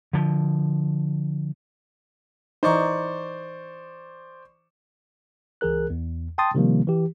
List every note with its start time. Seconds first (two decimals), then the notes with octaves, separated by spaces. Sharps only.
0.13 D3 F3
2.63 E3 D#4 C5 D5 C#6
5.61 C#2 E3 G#4 A#4 F#6
5.90 E2
6.38 G5 A5 C6 D#6 A6
6.54 C3 D#3 F3 G3 A#3
6.87 E3 G4